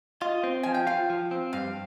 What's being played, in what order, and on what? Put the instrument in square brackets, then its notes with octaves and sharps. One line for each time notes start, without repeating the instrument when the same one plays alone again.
[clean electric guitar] F4 [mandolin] D#5
[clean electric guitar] C4
[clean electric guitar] F3 [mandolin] G#5
[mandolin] G5
[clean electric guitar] F4 [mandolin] F5
[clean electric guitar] F3
C4
[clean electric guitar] G2 [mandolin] F5